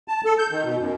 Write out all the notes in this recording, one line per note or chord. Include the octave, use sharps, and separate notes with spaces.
A5
A4
G6
D#3
B2
F#2